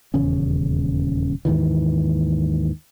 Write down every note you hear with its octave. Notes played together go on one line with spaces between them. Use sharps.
D#1 E2 C#3 C#4
D#2 G#2 D#3 E3